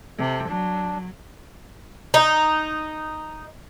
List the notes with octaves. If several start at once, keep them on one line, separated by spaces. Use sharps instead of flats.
C3 A4
F#3 D4
D#4